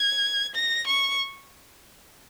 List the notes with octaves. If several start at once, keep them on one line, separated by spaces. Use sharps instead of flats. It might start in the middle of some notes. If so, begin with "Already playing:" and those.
Already playing: G#6
A#6
C#6